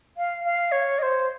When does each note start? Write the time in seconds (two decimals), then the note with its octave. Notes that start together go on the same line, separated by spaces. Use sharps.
0.17 F5
0.44 F5
0.72 C#5
0.99 D#5
1.02 C5